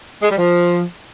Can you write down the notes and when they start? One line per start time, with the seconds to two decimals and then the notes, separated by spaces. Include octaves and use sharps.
0.23 G#3
0.30 G3
0.38 F3